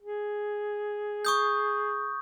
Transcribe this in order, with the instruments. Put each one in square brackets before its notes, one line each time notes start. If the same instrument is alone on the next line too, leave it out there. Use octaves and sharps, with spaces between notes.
[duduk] G#4
[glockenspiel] C#6 D#6 G6